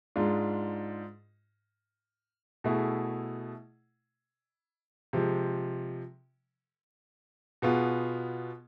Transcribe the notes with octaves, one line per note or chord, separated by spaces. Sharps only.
G#2 G#3 D4 F4
B2 A3 E4 G#4
C3 F3 G#3
B2 B3 F4 G#4